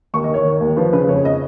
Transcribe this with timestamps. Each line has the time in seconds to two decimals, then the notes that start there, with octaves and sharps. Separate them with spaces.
0.14 D#2 C#6
0.24 D#5
0.30 D#3 C#5
0.45 D#3
0.61 D#2
0.76 F3 B4
0.93 C#3 B4
1.08 F2 C#5
1.25 D#5